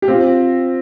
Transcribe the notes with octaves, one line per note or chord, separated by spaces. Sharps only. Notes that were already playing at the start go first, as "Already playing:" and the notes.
G4
C4 F4